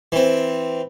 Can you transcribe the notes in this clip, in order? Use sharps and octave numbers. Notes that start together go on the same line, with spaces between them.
E3 C4